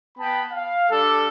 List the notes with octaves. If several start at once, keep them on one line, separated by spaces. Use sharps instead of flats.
B3 G5 A5 B5
F5
G3 D4 A4